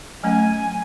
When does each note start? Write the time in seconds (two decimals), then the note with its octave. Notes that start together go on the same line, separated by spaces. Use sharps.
0.23 F#3 A3 C#4 G#5